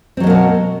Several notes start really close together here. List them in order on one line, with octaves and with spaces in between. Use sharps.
C4 F#3 G#3 A#3 B2